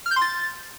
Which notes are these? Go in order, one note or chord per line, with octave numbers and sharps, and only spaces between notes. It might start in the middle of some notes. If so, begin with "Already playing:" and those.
F6
G6
C6
A6